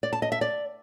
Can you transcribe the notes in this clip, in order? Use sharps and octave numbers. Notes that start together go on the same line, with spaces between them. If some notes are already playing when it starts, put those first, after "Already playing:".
D5
A5
D#5
E5
D5